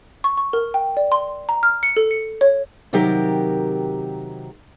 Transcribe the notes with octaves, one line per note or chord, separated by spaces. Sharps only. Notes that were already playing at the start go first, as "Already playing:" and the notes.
C#6
C#6
A#4
G5
D5
C6
A#5
F6
C#7
A4
C#7
C#5
C3 D#3 F#3 G4 A#4